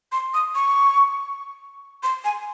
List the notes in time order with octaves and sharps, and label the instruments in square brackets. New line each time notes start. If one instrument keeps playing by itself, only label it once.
[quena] C6
D#6
C#6
C6
G#5